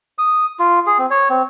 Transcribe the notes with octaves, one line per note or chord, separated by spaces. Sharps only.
D#6
F4
G#4
C4
C#5
C4